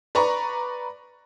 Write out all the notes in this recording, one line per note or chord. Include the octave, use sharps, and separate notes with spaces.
B4 D5 A#5 C#6